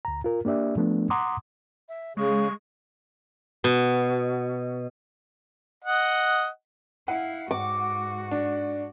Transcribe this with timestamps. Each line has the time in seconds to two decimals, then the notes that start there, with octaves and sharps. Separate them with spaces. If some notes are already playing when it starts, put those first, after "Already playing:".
0.05 D2 A#5
0.24 F4 A#4
0.45 A#3 D4 G4 D5 E5
0.77 F3 A3 B3 D4
1.10 F#5 A#5 C6 D6 D#6
1.89 E5
2.17 C#3 G#3 C#6
3.64 B2
5.84 D#5 F#5
7.08 E4 F5 F#5
7.51 G#2 F#4 D6
8.31 D4